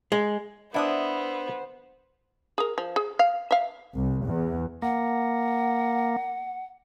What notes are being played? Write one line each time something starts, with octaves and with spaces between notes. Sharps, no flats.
G#3
B3 D4 E4 C5 E5 F#5 A5 D#6
G#4 A#4
F3
G#4
F5
E5 F5
C2
E2
A#3 F#5